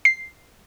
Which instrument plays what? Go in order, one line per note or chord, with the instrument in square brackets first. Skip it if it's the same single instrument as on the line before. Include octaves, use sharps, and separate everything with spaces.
[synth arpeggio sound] C7